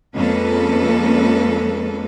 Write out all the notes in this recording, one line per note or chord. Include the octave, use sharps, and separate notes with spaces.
F2 G#3 A#3 C#4 A4 B4